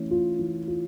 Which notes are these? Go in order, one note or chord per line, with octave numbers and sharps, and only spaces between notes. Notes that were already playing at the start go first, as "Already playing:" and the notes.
Already playing: E3 A3 C#4
F4
E3
F4